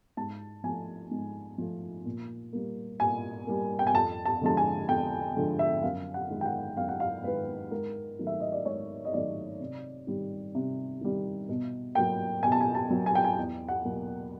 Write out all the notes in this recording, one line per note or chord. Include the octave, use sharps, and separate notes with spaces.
G#2 A5
F3 A3 G#5
G#2
F3 A3
A#2
G3 A#3
A#2 G#5
G3 A#3
G5
G#5
F2 A5
A5
D3 F3 G#3 A5
G#5
F2 G5
D3 F3 G#3
E5
F#2 F5
F#5
D#3 G#3
G5
F#5
F#2 F5
F#5
F5
D#3 G#3 B4
G#2 A#4
D#3 F#3 A3
E5
D#5
D5
G#2 C#5
D#5
D#3 F#3 A3 D5
C3
D#3 G3
C3
D#3 G3
B2
F#3 A#3 G5
B2 G#5
A5
G#5
A5
F#3 A#3
G#5
G5
G#5
E2
F#5
B2 F#3 A#3